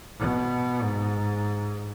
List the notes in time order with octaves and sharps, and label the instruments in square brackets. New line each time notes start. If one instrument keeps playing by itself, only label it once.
[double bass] B2
G#2